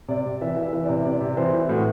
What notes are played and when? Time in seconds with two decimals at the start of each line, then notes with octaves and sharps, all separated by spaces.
0.08 C3 D5
0.25 C3
0.41 E3 E5
0.56 E3
0.63 E5
0.73 E3 E5
0.83 D5
0.89 C3
1.05 C3 D5
1.20 C3
1.37 E3 C5
1.53 E3
1.69 A2 F#4